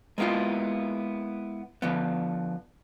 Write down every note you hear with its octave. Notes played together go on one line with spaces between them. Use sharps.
G#3 A#3 B3 E4 F4
D3 F3 B3